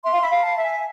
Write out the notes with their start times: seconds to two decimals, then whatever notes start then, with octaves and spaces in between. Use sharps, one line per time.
0.04 E5 C6
0.13 F5
0.21 E5 B5
0.30 F5
0.43 A5
0.57 E5
0.64 G#5